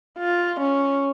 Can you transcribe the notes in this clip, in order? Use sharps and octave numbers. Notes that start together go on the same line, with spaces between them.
F4
C#4